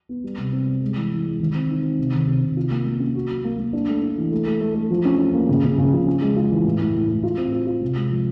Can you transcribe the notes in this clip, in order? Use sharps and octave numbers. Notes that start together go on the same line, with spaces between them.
B3
G3
C3
C4
G3
G#3
E3
E3
G#3
D#3
C4
D#4
C4
C3
D#3
C3
C3
F4
A#3
A#3
C#4
F#4
F#3
A#3
A#3
D4
A3
D4
E3
A3
A3
A3
A3
F3
C#4
C#4
A#3
C#3
C#3
C#3
F3
C#4
G#3
F4
E3
A2
A2
A2
A2
F4
C4
F4
F4
C3
G#3
F3